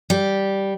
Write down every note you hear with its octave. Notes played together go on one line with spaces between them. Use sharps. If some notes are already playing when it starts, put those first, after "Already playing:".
G3